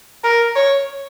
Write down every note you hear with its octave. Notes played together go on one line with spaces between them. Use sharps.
A#4
C#5